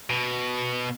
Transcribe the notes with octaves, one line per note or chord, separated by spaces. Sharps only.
B2